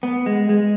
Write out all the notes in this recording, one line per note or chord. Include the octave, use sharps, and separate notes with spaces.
B3
G#3
G#3